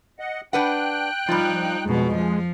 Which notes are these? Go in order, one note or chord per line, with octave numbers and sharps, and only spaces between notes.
D#5 F#5
D4 B4 F#5 G5 F#6
F3 G3 D#4 F4
F2 B2 G#3
F3